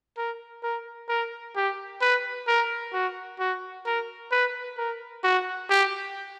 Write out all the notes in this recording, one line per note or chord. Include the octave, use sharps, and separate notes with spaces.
A#4
A#4
A#4
G4
B4
A#4
F#4
F#4
A#4
B4
A#4
F#4
G4